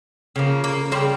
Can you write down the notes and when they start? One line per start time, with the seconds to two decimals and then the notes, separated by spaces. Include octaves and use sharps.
0.36 C#3 F3 A#3
0.64 A#3
0.92 C#3 G3 A#3 C4